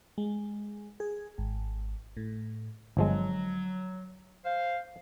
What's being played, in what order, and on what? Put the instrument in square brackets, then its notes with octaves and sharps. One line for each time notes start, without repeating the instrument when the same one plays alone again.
[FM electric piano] G#3
G#4
G#1
A2
[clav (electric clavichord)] G1 F3 G#3 [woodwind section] F#3
[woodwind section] C5 F5